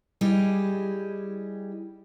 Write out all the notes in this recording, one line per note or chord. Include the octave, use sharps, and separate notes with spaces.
G3 E4 G4 G#4 D#5